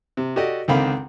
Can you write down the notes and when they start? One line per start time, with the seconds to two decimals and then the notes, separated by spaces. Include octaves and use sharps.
0.17 C3
0.36 F#4 G4 A4 D5 D#5
0.68 C#2 D3 D#3 C4 F5 B5